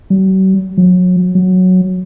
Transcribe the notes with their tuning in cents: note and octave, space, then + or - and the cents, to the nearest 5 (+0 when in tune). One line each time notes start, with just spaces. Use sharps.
F#3 +45
F#3 -30
F#3 -5